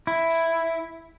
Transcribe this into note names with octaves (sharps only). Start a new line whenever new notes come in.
E4